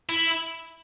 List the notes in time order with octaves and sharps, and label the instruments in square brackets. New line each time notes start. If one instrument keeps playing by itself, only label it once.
[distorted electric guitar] E4